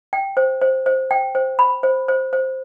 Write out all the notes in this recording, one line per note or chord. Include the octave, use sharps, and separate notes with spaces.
G5
C5
C5
C5
G5
C5
B5
C5
C5
C5